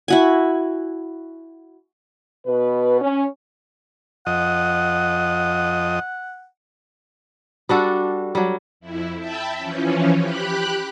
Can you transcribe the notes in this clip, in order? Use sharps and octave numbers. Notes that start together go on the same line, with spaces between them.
E4 F#4 G#5
B2 B4
C#4
F2 D#5 F#5
G3 D4 F#4 A4
F#3 G3
F2 E4
E5 G5 A5 B5
E3 F3 C#4
G4 B5 F#6